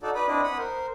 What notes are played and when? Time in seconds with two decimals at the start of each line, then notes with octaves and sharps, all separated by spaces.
0.03 D#4 F#4 A4 D5
0.15 B4 D5 B5 D#6
0.28 C4 D4 E4 D5 D#5 D#6
0.43 F#5 B5 D#6
0.58 A#4 C5